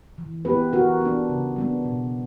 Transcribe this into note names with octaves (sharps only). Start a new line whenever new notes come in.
E3
B3 E4 G4 B4
E3 F#4 A#4
B3 D4
C#3
G3 B3 D4
B2